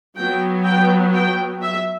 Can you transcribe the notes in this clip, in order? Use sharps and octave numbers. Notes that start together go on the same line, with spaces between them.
F#3 B3 G5
G5
G5
E5